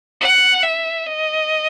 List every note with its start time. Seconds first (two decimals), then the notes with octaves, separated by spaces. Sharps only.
0.21 F#5
0.63 E5
1.06 D#5